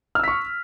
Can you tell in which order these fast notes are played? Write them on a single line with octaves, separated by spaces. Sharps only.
F6 E6 B6 C#6